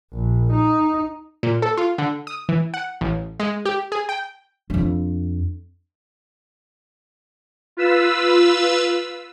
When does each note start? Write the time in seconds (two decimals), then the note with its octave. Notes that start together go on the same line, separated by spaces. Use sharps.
0.14 A#1
0.52 D#4
1.43 A#2
1.62 A4
1.77 F4
1.98 D3
2.27 D#6
2.49 E3
2.74 F#5
3.01 A1
3.40 G#3
3.65 G4
3.92 G#4
4.09 G5
4.70 F2 D4
7.77 F4 B4 E6